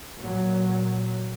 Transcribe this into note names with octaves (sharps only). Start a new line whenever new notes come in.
A#2 F#3